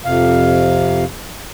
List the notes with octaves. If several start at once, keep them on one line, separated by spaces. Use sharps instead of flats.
F2 C3 F5